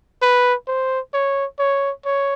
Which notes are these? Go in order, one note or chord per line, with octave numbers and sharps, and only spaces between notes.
B4
C5
C#5
C#5
C#5